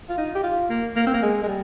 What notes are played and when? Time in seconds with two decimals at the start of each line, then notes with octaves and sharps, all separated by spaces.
0.09 F4
0.18 D#4
0.35 G4
0.44 F4
0.70 A#3
0.96 A#3
1.07 C4
1.14 A#3
1.22 G#3
1.43 G#3
1.48 G3